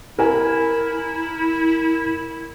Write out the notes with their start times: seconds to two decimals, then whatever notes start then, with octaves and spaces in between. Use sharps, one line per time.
0.19 E4 A#4 G#5 F6